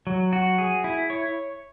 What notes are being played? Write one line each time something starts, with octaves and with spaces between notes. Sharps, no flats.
F#3
F#4
G#4
E4
C#5